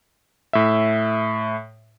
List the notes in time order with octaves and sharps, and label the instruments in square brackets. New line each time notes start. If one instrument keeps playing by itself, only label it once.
[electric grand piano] A2 E5